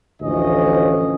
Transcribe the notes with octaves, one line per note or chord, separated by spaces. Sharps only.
A1 D2 F3 C#4 D#5